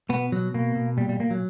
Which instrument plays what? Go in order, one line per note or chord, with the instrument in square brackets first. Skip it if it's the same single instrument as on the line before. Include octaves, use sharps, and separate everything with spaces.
[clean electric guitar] B2 B3
B2 F#3
B2 A#3
B2
A#2 G3
G3
A#2 A#3
F#3